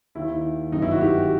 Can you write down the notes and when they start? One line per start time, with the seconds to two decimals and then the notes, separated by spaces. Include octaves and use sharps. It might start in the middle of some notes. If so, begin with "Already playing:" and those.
0.15 D#2 D#3 E4
0.72 G1 F#2 D#3 D#4
0.82 E4
0.91 F#4
1.01 G4